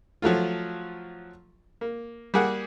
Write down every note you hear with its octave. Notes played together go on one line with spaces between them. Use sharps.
F3 F#3 A3 F4
A#3
G3 A#3 G#4 F#5